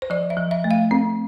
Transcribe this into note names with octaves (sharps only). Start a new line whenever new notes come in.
C5
F3 D5
E5
F3
E5
A3
F5
C4